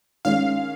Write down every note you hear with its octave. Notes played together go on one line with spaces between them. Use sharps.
D#3 G#3 C#4 F5